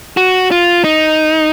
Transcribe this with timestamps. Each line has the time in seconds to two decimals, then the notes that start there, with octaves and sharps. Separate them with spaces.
0.17 F#4
0.51 F4
0.84 D#4